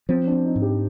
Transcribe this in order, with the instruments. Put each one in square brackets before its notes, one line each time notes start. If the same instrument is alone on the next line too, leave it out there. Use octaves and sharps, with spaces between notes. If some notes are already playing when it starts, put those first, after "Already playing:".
[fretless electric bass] F3 [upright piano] C4
[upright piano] D4
[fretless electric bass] C4
[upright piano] D#4
[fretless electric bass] G#2
[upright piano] G4